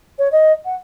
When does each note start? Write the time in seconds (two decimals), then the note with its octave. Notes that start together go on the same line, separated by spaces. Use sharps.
0.19 C#5
0.32 D#5
0.65 F#5